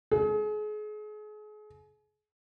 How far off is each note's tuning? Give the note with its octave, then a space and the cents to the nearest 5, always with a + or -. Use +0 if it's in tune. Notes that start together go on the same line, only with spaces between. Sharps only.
G#4 +35